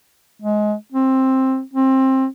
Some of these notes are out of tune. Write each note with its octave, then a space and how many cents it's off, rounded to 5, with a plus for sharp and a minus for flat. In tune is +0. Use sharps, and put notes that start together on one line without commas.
G#3 +20
C4 +10
C4 +20